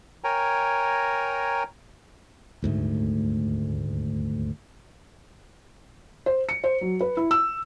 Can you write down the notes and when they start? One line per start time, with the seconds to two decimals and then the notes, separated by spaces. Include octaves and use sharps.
0.24 A#4 C#5 G5 G#5 A#5
2.62 D#1 D2 G#2 A3
6.26 C5
6.49 C#7
6.64 C5
6.81 F#3
7.01 B4
7.17 E4
7.31 E6